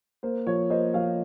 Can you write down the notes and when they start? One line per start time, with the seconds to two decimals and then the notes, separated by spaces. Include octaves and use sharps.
0.23 A#3 C5
0.47 F3 C#5
0.70 A#3 C5 D#5
0.94 F3 C#5 F5